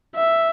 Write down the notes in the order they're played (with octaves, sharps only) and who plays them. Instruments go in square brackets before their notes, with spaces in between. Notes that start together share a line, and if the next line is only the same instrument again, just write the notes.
[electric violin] E5